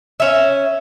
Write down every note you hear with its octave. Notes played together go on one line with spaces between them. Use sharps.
C#4 E5